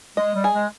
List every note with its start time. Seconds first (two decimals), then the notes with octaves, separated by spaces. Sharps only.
0.17 G#3 D#5
0.35 G3
0.44 G#4
0.53 G#3